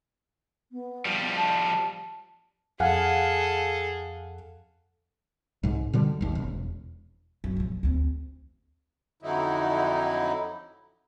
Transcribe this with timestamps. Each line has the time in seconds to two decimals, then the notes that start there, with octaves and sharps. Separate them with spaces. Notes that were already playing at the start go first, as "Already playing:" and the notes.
0.71 B3
1.05 F3 G3
1.36 A5
2.80 F2 G#4 A4 F5 F#5 G#5
5.63 C2 G#2
5.93 B2 D3 G3
6.21 G#1 D#2
6.35 E1
7.44 F#2
7.57 A#1 F3
7.83 D2 C4
9.22 F2 D3 F#3 D#4 E4